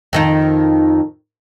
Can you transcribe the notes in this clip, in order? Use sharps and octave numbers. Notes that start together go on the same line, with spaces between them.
F2 D#3 D#4